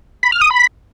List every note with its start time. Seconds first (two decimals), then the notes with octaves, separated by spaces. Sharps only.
0.23 B5
0.32 F6
0.41 D#6
0.51 B5